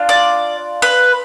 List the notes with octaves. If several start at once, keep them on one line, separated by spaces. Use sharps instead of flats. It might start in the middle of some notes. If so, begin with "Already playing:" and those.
Already playing: D4 F4
D5
B4